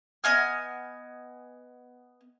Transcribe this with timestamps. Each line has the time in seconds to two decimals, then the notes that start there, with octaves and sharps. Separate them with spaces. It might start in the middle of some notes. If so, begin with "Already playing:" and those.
0.24 B3 D#5 G#5 F6